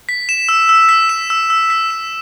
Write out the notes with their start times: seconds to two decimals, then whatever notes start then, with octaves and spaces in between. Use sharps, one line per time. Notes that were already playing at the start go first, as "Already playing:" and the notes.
0.09 B6
0.29 E7
0.49 E6
0.69 E6
0.89 B6
1.09 E7
1.30 E6
1.50 E6
1.70 B6
1.90 E7